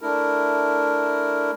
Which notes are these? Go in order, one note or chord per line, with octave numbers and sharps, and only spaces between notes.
A3 D4 E4 A#4